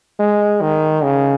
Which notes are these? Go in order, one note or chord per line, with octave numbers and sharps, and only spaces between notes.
G#3
D#3
C#3